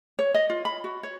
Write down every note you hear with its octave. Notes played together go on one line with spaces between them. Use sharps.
C#5
D#5
F4
B5
F#4
C#5